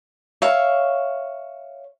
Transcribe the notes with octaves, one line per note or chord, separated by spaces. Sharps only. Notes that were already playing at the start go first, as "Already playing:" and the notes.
C#5 E5 F5